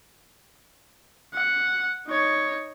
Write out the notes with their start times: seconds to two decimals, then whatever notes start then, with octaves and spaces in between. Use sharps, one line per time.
1.34 F#5
2.07 D#4 C#5